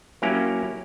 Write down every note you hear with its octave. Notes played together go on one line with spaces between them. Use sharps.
F#3 A#3 C#4 E4 G4 A#5